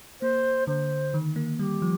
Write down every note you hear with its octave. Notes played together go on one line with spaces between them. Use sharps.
A#3 C5
D3 C5
D#3
A#3
G3 G4
F3